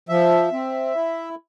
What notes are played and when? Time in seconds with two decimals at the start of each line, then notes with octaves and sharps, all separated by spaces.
0.09 F3 E5
0.52 C4
0.95 E4